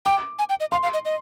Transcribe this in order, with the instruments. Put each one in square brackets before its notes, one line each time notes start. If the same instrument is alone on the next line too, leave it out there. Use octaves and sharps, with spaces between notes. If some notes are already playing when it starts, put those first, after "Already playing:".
[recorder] G5 [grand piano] D6
[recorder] G#5
G5
D#5
[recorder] F5 [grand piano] C6
[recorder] F5
D#5
D#5